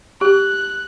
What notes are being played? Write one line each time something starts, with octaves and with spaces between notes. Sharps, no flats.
G4 F#6